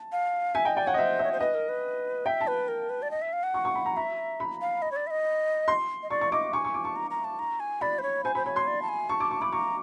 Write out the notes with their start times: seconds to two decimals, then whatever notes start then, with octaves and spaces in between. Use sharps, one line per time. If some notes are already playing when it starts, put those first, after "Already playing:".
Already playing: A5
0.12 F5
0.55 E5 G#5
0.65 D#5 G5
0.76 D5 G5
0.87 C#5 F#5
0.94 D#5
0.97 C5 E5
1.19 C#5 E5
1.32 C5
1.40 B4 D#5
1.54 A#4
1.69 B4
2.26 E5 G5
2.41 A5
2.47 B4
2.68 A#4
2.90 B4
3.02 D5
3.11 D#5
3.22 E5
3.33 F5
3.43 F#5
3.54 C#6
3.65 C#6
3.75 B5
3.86 A#5
3.97 E5 A#5
4.40 B5
4.61 F5
4.82 D#5
4.92 C#5
4.96 D5
5.07 E5
5.11 D#5
5.68 C6
6.03 D#5
6.10 D5 C#6
6.21 C#6
6.32 D#5 D6
6.53 G#5 C#6
6.64 C#6
6.74 D6
6.84 A5 C#6
6.96 A#5
7.11 A#5
7.24 A5
7.39 A#5
7.60 G#5
7.81 D5 B5
7.99 C5
8.03 C#5
8.24 C5 G#5
8.35 C5 B5
8.46 C#5 B5
8.56 C6
8.67 D5
8.82 A5
8.89 G#5
9.09 A5 C#6
9.20 D6
9.31 C#6
9.41 B5 D6
9.52 A#5 C#6